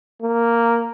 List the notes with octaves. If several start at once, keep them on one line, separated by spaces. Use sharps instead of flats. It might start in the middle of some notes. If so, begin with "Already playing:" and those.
A#3